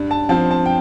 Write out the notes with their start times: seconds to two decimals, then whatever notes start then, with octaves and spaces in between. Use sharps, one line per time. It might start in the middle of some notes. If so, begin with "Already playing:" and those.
Already playing: G2
0.11 A5
0.29 F3 C4 A5
0.51 A5
0.66 G5